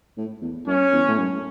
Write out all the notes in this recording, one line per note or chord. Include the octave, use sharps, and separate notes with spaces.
A2
E2
F#2 C#4
E2
A2
F#2